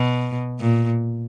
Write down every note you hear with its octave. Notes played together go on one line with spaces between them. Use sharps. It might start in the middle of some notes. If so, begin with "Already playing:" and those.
Already playing: B2
A#2